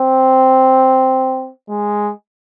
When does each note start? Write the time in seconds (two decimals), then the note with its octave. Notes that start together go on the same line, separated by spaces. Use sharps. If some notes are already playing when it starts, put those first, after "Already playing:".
Already playing: C4
1.69 G#3